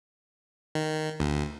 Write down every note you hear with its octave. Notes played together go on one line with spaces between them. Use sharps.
D#3
D2